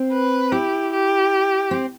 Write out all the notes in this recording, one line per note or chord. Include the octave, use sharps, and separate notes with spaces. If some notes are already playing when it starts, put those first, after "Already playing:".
Already playing: C4
B4
E4 G4
G4
C4